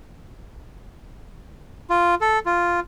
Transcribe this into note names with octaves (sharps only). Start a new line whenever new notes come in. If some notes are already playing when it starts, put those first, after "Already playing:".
F4
A4
F4